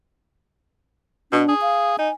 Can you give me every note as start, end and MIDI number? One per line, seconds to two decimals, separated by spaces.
1.32 1.44 47
1.32 1.54 62
1.49 1.95 68
1.61 1.96 77
1.98 2.09 63
1.98 2.13 80